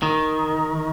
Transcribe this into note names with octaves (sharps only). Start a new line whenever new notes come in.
D#3